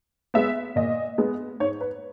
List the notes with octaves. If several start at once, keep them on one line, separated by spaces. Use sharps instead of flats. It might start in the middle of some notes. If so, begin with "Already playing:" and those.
G#3 B3 E5
A#2 D#5
G#3 B3
G#2 C#5
B4